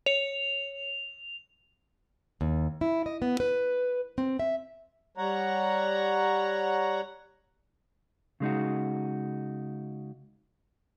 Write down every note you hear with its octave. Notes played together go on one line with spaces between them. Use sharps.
C#5 C#7 F7
D#2
E4
D#5
B3
B4
C4
E5
G3 C#5 F#5 A#5
C#3 G#3 D#4 F#4